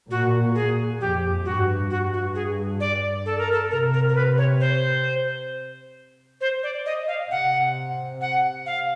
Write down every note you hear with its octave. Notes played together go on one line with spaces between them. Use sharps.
A#2 F#4
G#4
F2 G4
G2 F#4
G2 F#4
F#4
G#4
D5
A4
A#4
A4
C3 A#4
A#4
A#4
B4
C#5
C5
C5
D5
D#5
F5
C3 F#5
F#5
F5